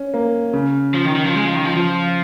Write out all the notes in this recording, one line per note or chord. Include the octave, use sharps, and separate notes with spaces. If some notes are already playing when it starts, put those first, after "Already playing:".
Already playing: C#4
A#3
C#3
F3
D#3
D#3
F3
G#3
F3
D#3
F3
F3